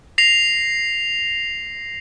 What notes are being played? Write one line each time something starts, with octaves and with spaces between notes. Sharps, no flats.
A#6 C7 F7